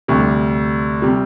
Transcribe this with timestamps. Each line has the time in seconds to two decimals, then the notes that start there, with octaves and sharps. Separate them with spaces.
0.08 D2 C3 G3
1.02 C3 G3